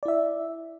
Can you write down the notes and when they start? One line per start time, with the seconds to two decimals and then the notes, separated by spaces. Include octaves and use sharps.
0.03 D5
0.05 E4
0.08 E5